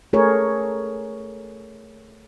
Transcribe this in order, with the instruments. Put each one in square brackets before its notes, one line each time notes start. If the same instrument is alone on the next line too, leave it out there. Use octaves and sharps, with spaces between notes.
[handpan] A3 G#4 A#4 C#5